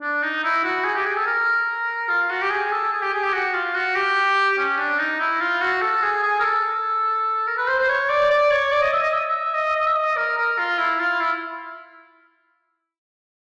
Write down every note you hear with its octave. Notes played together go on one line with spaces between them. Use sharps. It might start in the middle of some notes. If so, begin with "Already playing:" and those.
D4
D#4
E4
F#4
G#4
G4
G#4
A4
A#4
F4
F#4
G4
G#4
A4
G#4
G4
G#4
G4
F#4
F4
F#4
G4
C#4
D4
D#4
E4
F4
F#4
A4
G#4
G#4
A#4
A4
A#4
B4
C5
C5
C#5
D5
D5
C#5
D5
D#5
E5
D#5
E5
E5
D#5
D#5
E5
D#5
A#4
A#4
F4
E4
F4
E4